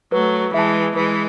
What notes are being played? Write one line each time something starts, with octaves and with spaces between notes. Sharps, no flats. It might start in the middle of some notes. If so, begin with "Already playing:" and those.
F#3 A3 B4
E3 G#3 E5 A5
E3 G#3 B4